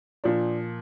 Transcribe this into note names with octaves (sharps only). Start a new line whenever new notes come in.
A#2 F3 D4